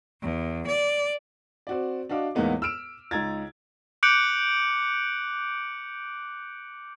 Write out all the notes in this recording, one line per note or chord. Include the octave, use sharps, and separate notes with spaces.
E2
D5
C4 F#4 D5
D4 F#4 D#5 F5 D6
E2 A2 G#3 A#3 B3 D#4
E6 F6 D7 E7
C#2 D#4 A#5 G#6 A6
D6 F#6 G6 C#7 D7 F#7